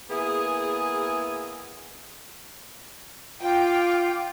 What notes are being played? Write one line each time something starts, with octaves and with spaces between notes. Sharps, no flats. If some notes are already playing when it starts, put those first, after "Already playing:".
A#3 B3 E4 G#4
F4 G5 D6